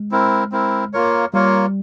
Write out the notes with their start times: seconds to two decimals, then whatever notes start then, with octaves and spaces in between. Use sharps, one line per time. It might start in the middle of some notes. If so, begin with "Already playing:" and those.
Already playing: G#3
0.11 C4 E4 A#4
0.52 C4 E4 A#4
0.93 A#3 F4 A#4 C#5
1.33 G3 A#3 F4 A#4 C#5